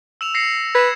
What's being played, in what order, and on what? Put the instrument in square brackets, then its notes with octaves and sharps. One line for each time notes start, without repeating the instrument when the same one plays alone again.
[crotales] E6 E7 F7
A#6 C7 C#7
[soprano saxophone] B4 [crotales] G#6 E7